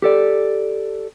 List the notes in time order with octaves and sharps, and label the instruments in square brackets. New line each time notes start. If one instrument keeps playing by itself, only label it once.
[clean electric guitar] G4 A4 D5